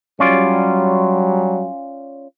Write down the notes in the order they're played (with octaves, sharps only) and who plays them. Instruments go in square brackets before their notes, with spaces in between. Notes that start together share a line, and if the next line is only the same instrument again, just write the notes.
[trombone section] F#3 G3 [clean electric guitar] C#4 F4 D5